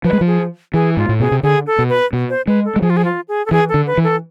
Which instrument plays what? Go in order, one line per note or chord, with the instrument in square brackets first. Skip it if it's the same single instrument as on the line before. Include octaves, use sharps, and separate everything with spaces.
[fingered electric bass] F3 [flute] B4
[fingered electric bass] G#3
F3
[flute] G#4
[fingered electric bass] E3 [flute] G#4
[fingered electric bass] G#2 [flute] F4
[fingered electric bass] A2
[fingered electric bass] B2 [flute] G#4
[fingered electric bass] C3
[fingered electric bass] D3 [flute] G#4
[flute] A4
[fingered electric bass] B2
[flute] B4
[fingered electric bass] B2
[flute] C5
[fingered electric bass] G#3 [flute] B4
[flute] A4
[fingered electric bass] G#3
[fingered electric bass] F3 [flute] G#4
[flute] F4
G#4
F4
G#4
A4
[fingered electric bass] E3 [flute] G#4
[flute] A4
[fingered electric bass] D3
[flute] B4
[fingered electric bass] E3
[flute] A4